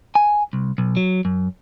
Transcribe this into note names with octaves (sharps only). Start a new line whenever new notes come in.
G#5
C2
B1
F#3
F#2